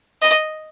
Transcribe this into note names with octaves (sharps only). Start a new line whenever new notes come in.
D#5